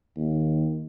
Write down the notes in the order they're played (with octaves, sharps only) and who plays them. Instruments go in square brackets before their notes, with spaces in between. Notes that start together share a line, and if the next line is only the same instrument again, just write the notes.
[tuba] D#2